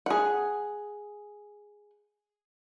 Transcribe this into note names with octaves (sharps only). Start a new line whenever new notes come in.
G#4 F#5